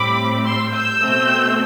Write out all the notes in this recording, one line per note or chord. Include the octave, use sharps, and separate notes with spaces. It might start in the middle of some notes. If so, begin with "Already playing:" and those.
Already playing: A2 G3 C4 B5 D6
C6 E6
E6 G6
B2 A3 C4